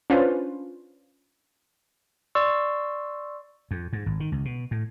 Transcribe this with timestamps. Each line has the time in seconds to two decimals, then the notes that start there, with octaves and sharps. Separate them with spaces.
0.10 C#4 D4 F4 B4 C5
2.35 D5 C6 C#6 E6
3.71 F2
3.93 G#2
4.06 G#1
4.20 D#3
4.32 C#2
4.45 B2
4.71 A2